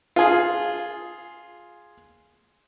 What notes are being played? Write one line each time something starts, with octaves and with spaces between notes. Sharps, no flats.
F4 G#4